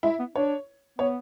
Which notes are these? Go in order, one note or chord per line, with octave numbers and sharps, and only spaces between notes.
G#3 E4
B3
D4 C#5
B3 C#5